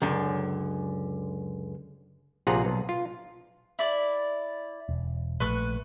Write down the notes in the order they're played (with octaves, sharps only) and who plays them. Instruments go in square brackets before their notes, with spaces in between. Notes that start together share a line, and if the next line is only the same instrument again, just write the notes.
[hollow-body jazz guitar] C#2 F#2 D3
[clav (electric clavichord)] A#1 C3 F4 G#4 F#5 A#5
B1
F4
[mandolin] E4 D5
[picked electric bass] E1
[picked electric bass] A#1 A3 [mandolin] B4 C#6 F#6